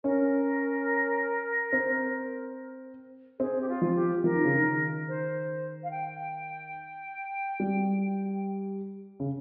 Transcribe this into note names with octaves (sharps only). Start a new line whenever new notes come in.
C#4 A#4
C4
C4 G#4
G4
F4
F3
G4
F3 A#4
D#3
C#3
D#3
C5
F5
G5
G3
C#3